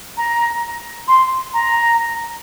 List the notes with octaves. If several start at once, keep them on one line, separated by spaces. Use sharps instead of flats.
A#5
C6
A#5